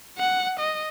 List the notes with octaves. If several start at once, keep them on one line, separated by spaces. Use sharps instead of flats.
F#5
D#5